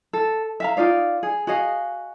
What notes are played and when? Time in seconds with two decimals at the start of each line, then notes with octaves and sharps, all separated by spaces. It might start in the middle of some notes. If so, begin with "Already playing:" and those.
0.13 A4
0.60 E5 F5 A#5
0.77 D#4 F4 D5 F5
1.23 G#4
1.47 F#4 G#4 D#5 F5